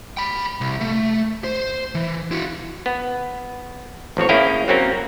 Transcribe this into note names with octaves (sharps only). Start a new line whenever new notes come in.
G5 B5
C2
A3
C5
E3
E4 F#4
B3
A1 F3 C4 C#5
A#3 C#4 E4 G#4 F5 G5
F#3 A#3 C4 C#4 A#4